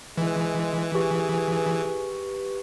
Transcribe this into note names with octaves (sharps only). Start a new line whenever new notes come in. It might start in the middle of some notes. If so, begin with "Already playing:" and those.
E3 G#3
G4 G#4 B4 C#6